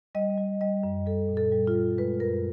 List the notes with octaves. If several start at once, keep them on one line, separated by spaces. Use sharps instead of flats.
G3 D#5
G3
G3 D#5
F#2
G3 A4
A#2
A4
G3
F4
G3
G#3 B4
F#2 A#4